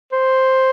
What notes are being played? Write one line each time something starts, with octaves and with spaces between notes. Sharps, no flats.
C5